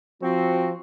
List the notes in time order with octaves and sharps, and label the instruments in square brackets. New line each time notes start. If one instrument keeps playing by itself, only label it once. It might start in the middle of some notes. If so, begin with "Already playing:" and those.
[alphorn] F3 [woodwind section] C4 F#4